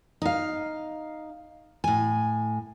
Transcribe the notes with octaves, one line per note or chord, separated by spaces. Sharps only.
D#4 F5
A2 G#5